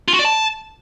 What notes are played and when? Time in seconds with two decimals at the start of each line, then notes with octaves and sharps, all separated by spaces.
0.08 F4
0.14 F#4
0.19 D5
0.25 A5